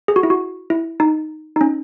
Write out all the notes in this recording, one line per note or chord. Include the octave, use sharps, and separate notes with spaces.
G#4
F#4
E4
F#4
E4
D#4
D#4
C#4